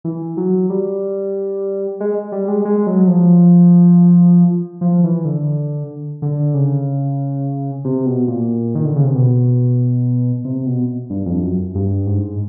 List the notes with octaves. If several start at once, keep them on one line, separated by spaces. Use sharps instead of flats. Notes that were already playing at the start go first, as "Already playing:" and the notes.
E3
F#3
G3
G#3
G3
G#3
G#3
F#3
F3
F3
E3
D3
D3
C#3
C3
B2
A#2
D#3
D3
C#3
C3
B2
C3
B2
G2
F2
F#2
G2
G#2